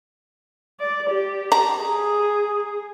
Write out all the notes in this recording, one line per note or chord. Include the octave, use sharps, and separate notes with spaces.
D5
G4
A#5
G#4